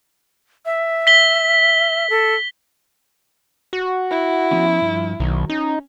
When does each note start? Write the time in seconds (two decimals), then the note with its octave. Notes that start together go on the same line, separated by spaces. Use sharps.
0.65 E5
1.07 B6 G7
2.10 A4
3.73 F#4
4.11 E4
4.51 F3 B3 C#4
4.81 G2 F3
5.20 B1 D#3 F#3
5.50 C#4 D#4